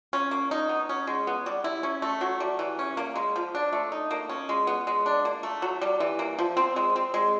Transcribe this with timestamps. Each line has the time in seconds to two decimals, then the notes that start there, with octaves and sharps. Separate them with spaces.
0.13 C#4
0.31 A#3
0.51 D#4
0.69 B3
0.89 C#4
1.07 G#3
1.27 B3
1.46 G3
1.64 E4
1.83 C#4
2.02 A3
2.21 F#3
2.40 G3
2.59 E3
2.79 C#4
2.97 A#3
3.16 G#3
3.36 F3
3.55 D4
3.73 A3
3.92 D#4
4.11 A#3
4.29 C#4
4.49 G#3
4.67 B3
4.87 G#3
5.06 D4
5.25 A#3
5.43 A3
5.62 F#3
5.81 G3
6.00 E3
6.19 A#3
6.39 F3
6.57 C4
6.76 G#3
6.96 C4
7.14 G#3